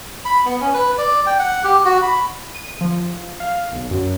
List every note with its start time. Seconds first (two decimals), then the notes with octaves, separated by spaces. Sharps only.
0.25 B5
0.45 B3
0.61 C#4
0.73 B4
0.98 D5
1.26 G5
1.39 F#5
1.64 G4
1.85 F#4
2.02 B5
2.54 D#7
2.81 F3
3.40 F5
3.71 B1
3.91 F#2